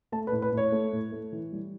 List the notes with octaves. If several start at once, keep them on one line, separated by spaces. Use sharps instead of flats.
A3 A5
B4
A2
B4
A2 C#5
A3
A2
A3
E3
G3